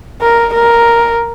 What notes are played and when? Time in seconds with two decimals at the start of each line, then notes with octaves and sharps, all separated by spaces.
0.22 A#4
0.54 A#4